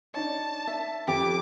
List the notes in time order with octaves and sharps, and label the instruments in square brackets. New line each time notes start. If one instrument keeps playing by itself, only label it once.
[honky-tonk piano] D4 D#4 C#5 [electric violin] A5
[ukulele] E5
[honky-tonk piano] F2 [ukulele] G4 [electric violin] D6